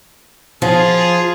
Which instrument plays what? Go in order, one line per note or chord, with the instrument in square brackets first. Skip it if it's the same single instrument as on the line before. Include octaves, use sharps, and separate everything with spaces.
[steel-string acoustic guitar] F3 [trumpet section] F4 G#4